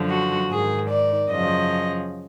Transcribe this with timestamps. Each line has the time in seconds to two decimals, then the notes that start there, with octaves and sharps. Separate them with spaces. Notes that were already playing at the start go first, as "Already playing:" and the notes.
Already playing: F#2 D3 F3
0.09 F#4
0.49 G#2 D#3 G#4
0.89 D5
1.29 F#2 C#3 F3 D#5